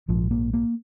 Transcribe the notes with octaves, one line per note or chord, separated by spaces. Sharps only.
A#1 G#2 F3
A#3
A#3